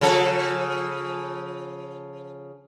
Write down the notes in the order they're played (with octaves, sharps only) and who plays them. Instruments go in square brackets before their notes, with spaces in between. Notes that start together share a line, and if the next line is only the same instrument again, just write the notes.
[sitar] C#3 F3 A4